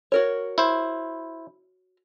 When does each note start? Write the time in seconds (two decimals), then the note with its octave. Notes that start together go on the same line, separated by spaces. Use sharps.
0.12 F#4 A#4 C#5
0.58 E4 C5